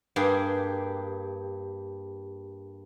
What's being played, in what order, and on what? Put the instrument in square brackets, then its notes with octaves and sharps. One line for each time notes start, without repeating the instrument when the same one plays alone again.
[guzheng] G2 A#3 G4 G#4